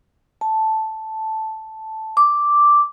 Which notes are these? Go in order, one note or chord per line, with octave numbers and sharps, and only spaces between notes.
A5
D6